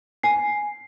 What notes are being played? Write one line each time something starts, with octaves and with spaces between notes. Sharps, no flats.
G#5 C7